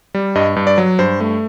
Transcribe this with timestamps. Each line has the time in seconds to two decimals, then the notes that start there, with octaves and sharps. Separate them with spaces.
0.14 G3
0.35 G2 D#5
0.56 G2
0.67 D5
0.78 F#3
0.99 G2 C5
1.20 A3